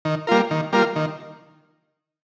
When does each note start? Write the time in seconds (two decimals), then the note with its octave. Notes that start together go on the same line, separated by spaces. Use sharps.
0.05 D#3
0.27 G3 A#3 F4 A#4
0.51 D#3
0.73 G3 A#3 F4 A#4
0.96 D#3